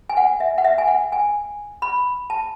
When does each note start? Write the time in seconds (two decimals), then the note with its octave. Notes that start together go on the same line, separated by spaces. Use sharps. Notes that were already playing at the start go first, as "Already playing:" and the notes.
0.10 G#5
0.17 F#5
0.40 E5
0.58 F#5
0.65 E5
0.78 G#5
0.87 F#5
1.12 G#5
1.82 B5
2.30 A5